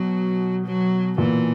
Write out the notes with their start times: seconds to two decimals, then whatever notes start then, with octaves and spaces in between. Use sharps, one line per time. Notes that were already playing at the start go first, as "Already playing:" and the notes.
Already playing: B2 F#3
0.66 F#3
1.18 A#2 E3